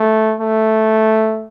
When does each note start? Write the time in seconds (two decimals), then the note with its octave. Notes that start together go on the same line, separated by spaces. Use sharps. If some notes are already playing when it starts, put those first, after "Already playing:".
Already playing: A3
0.41 A3